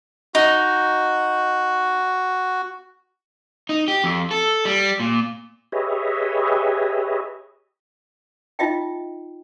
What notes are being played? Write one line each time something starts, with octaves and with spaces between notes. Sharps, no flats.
D#4 F#4
D#4
G4
F2
A4
G3
A#2
G4 G#4 B4 C#5 D#5 E5
D#4 F4 D#5 E5 G5